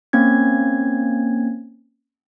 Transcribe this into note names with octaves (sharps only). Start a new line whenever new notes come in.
A#3 C4 C#4 G#6